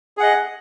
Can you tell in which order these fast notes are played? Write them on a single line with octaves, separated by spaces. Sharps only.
G#4 F#5 D#5